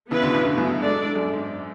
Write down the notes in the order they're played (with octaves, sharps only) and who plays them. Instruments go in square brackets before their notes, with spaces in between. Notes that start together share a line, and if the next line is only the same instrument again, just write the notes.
[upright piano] C#3 E3 [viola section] B3 E4 B4
[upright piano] B2 D3
A2 C#3
B2 D3
F#2 A2
F#2
[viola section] G#3 D4 A4 D5
[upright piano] F#2
G#2